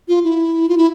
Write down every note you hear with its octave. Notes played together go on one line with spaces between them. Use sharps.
F4
E4
F4
E4